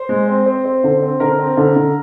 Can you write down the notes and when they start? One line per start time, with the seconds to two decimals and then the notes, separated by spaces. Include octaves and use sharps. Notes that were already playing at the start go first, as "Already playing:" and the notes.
Already playing: C5
0.09 G#3
0.28 C4
0.46 C4
0.65 C4
0.84 D3
1.02 C4
1.20 D3 A#4
1.39 C4
1.57 D3
1.76 D3